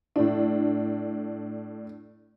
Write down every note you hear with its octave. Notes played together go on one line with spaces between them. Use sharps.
A2 D4